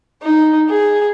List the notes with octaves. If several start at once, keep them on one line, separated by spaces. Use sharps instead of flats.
D#4
G#4